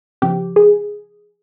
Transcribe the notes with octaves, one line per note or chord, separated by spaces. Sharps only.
C#3 F3 G4
G#4